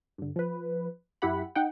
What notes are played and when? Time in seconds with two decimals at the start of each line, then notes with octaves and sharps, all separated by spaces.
0.18 G2 D3
0.36 F3 B4
1.22 F#2 E4 G4 F#5 B5
1.55 D#4 F#5 G5